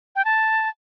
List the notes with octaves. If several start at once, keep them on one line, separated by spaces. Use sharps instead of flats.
G5
A5